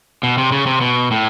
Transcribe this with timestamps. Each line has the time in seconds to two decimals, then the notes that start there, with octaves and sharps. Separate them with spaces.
0.23 B2
0.38 C3
0.52 C#3
0.66 C3
0.81 B2
1.11 A2